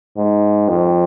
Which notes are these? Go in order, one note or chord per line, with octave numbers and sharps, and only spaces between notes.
G#2
F2